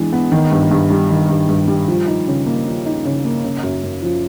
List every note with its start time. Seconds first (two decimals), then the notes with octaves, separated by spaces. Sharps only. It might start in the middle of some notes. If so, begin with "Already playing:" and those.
Already playing: E3 G#3 B3 D4
0.13 B3
0.32 D#3
0.51 G2
0.71 G2
0.90 G3
1.10 D#3
1.30 G2
1.49 G2
1.68 G3
1.88 F3
2.07 D#4
2.27 C#3
2.46 A#3
2.66 F3
2.86 D#4
3.05 C#3
3.25 A#3
3.44 C#3
3.63 F#2
3.84 F#2
4.02 F3